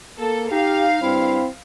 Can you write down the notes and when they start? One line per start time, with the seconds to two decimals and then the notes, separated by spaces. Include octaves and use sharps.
0.19 A#3 A4
0.51 D#4 G4 F5
1.02 G2 C4 E4